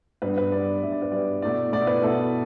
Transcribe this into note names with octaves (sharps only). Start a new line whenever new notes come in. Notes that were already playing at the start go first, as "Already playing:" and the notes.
G2 G3 B3 B4
B4
G2 G3 B3 D5
G2 G3 B3 E5
D5
B4
G2 G3 B3 D5
B2 A3 E4 D5
B2 A3 E4 D5
B4
B2 A3 E4 A4